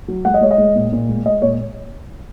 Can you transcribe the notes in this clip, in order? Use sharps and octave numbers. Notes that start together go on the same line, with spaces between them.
F#3
G#3 F#5
D#5
G#3 C#5
D#5
G#3
A#2
A#2
G#3
G#3 D#5
A#2 C#5